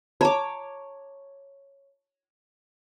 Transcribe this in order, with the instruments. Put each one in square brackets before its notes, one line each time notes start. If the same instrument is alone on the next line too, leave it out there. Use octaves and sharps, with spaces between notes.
[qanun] C#5 D6 [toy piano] A5 A#5